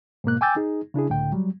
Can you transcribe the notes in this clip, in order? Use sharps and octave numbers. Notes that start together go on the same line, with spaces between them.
G#2 B2 A#3 F#6
G5 G#5 D6 E6 G6 A6
D#4 G#4
C#3 D4 E4 G#4
C#2 A2 D3 G5
F#3 G3